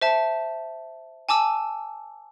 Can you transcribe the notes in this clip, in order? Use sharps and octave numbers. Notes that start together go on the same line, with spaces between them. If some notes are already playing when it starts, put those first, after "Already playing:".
C5 E5 A5
G#5 A5 D6 E6